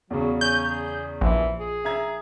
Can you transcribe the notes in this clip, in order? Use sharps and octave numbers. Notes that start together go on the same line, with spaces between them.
E2 C#3 F#3
C#4 G6
G#4
A#1 E3
G#4
E5 A#5 G#6